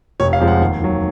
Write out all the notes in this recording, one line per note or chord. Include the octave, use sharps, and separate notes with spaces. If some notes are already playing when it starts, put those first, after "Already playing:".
F1 C#5
F5
F2 F3 G#3
F#5
D#2
D#3 F#3